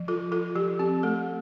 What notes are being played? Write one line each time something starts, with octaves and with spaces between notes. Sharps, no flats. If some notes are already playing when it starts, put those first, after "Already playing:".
Already playing: F3
F4 A4
F4 A4
F3 G4
C4 G4
A3 A4